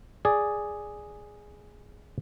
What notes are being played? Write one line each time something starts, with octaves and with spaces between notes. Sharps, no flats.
G#4 D5